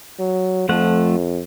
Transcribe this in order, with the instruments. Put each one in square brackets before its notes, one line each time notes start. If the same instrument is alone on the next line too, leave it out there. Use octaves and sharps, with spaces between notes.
[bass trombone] F#3
[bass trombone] F2 [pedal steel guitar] F3 A3 F#5